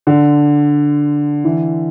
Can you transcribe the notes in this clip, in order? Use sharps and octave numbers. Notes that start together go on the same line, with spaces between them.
D3
E3